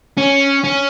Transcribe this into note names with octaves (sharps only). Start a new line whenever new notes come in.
C#4
C#4